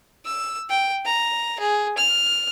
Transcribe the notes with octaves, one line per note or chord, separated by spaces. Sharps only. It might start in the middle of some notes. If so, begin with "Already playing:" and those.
E6
G5
A#5
G#4
F6